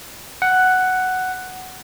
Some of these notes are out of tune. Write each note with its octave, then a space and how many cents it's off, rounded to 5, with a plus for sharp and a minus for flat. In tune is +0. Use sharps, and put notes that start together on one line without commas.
F#5 +5